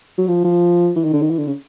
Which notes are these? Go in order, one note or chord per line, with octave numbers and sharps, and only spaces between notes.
F#3
F3
F3
E3
D#3
D3
D#3
E3
D3
C#3